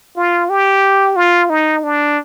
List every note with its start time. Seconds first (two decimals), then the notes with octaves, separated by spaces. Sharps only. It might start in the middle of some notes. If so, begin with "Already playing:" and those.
0.17 F4
0.50 G4
1.16 F4
1.50 D#4
1.83 D4